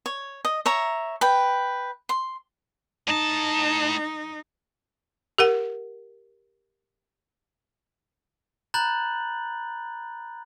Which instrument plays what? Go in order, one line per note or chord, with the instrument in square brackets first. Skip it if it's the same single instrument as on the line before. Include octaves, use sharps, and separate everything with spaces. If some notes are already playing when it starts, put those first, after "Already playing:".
[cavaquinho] C#5
D#5
C#5 E5 A#5
B4 G5
C6
[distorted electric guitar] A2 A5 [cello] D#4
[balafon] G4 A#4 F#5
[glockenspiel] A#5 B5 F#6 G6 A6 F#7